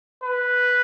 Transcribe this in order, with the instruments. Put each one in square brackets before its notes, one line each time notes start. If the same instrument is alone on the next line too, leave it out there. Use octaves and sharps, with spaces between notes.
[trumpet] B4